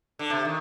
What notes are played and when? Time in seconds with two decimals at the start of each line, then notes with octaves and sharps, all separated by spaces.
0.19 D3
0.30 C3
0.45 D#3